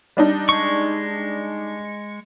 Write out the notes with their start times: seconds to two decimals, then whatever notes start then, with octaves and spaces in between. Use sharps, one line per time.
0.17 G3 D4 D#4
0.49 G#3 C#6